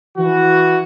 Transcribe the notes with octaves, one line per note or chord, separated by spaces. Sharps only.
E3 F#4